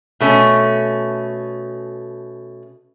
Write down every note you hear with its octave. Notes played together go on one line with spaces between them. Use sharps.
B2 A3 C#4